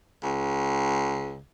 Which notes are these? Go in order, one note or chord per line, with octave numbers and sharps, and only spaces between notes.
C#2